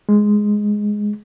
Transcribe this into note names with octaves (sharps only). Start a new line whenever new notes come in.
G#3